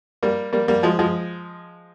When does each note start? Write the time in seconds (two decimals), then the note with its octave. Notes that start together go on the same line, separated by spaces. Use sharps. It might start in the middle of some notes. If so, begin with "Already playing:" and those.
0.23 G3 A#3
0.53 G3 A#3
0.68 G3 A#3
0.83 F3 G#3
0.99 F3 G#3